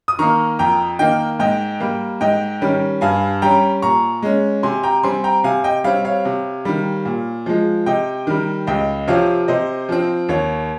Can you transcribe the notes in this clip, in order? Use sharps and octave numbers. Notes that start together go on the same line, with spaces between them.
D#6
D#3 A#3 A#5 C#6
F2 G5 A#5
D#3 A#3 D#5 G5
G#2 D#5 G5
G3 A#3
G#2 D#5 G5
D#3 G3 C#4
G2 F5 G#5
G3 C#4 G5 A#5
A#2 A#5 C#6
G#3 C#4
C3 G#5 C6
G5 A#5
G3 C4 G#5 C6
G5 A#5
C3 F5 G#5
D#5 G5
G3 C4 C#5 F5
C#5 F5
C3
D#3 G3
A#2
F3 G#3
C3 D#5 G5
D#3 G3
C#2 D#5 G5
C3 F3 C4 C#5 F5
C3 C5 D#5
F3 C4
D#2 C#5